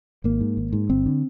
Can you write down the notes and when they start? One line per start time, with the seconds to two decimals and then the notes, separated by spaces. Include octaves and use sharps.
0.24 G#1 A#3
0.41 G#2
0.57 G#1
0.73 G#2
0.89 G1 C4
1.06 D3